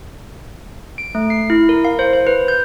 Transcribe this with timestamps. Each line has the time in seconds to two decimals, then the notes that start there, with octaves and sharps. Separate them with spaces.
0.98 D7
1.15 A3
1.30 C7
1.50 E4
1.69 A#4
1.85 F5
1.99 C5
2.13 C5
2.27 B4
2.48 G6